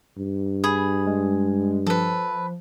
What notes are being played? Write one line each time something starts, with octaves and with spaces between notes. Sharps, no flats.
G2
G#4 B5
G#3
F3 A4 B4